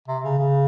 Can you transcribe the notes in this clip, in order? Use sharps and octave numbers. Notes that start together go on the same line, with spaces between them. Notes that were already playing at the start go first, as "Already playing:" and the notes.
C3
C#3
C#3